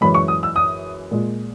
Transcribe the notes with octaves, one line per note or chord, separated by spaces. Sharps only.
F#2 E3 G#3 B5
C#6
D#6
E6
D#6
A#2 G#3